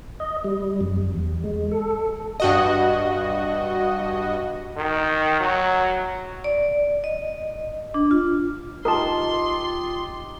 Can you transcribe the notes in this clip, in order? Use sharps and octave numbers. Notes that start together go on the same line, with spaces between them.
D#5
G3
F#2
E2
G#3
A4
G2 F#4 D#5
D#3
F#3
D5
D#5
D4
F4
D#4 F4 G4 A#4 A5 C6